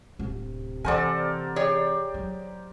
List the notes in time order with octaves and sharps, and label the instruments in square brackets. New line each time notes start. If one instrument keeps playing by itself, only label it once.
[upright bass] D1 [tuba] C3
[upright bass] E3 [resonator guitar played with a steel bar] A4 F#5 G#5 [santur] A#4 C5 D5
[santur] G4 D5 [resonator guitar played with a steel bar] G#4 C#5
[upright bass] F#3